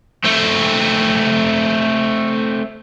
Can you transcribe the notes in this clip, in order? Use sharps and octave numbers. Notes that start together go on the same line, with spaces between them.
A3 C4